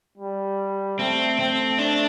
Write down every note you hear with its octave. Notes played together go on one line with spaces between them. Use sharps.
G3
A3 C4
C4
D4